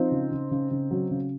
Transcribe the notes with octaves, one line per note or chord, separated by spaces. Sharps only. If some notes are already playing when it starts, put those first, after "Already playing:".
Already playing: F3 C4 D#4
C#3
C#3
C#3
C#3
F#3
C#3